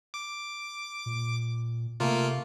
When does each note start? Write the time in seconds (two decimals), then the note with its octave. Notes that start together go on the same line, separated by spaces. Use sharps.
0.14 D6
1.06 A#2
2.00 C3 A3 A#3 F4